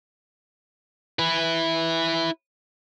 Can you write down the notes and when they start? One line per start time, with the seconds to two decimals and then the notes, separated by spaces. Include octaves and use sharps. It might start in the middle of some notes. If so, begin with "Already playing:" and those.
1.19 E4 B4